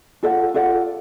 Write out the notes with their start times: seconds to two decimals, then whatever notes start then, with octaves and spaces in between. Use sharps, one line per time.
0.23 F4 A4 D5 F#5
0.54 F4 A4 D5 F#5